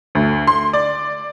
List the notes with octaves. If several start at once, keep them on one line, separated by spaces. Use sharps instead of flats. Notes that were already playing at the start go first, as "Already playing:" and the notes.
D2
C6
D5